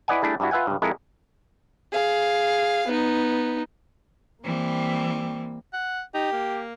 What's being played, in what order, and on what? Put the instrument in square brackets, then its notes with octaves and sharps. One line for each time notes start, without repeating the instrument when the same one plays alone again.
[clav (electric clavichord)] E4 B4 D5 D#5 F#5 G#5
G3 A3 D4 E4 G#4
G2 D4 E4 F#4
F4 B4 E5 F#5 G#5
C#2 G2
F2 G#3 E4 A4 A#4
[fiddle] G#4 F5
B3 D#4
[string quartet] E3 G3 C4 [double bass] A#3
[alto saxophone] F#5
[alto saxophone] D#4 [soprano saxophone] G4
[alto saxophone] A#3